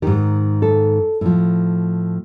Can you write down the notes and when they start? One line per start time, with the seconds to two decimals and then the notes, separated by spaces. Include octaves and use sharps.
0.02 D#3 G4
0.07 G#2
0.62 A4
1.21 A2 F3